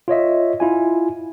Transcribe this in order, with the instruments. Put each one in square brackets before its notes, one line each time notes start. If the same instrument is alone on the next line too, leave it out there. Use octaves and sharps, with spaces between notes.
[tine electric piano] F4 C#5 D#5 E5
E4 F4 G#5